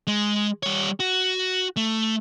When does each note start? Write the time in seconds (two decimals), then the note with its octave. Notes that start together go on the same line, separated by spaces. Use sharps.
0.07 G#3
0.63 G3 C#5
1.00 F#4
1.76 A3